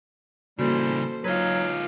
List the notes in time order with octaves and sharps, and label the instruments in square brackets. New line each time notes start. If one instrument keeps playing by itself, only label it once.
[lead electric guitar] C#3 E3 [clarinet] G3 [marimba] A#3 F#4 [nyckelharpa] A4 C5
[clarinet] F#3 [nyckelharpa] D#4 F5 [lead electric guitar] F4 B4